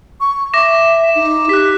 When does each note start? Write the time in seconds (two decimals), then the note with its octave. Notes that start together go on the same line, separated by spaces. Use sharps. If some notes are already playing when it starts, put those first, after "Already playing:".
0.21 C#6
0.54 E5 D6 A#6 E7
1.15 D#4
1.49 G4 F#6 B6